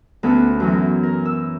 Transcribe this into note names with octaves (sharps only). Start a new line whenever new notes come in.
D2 B3 C#4 A4
F#2 E3 F#3
A#4
E6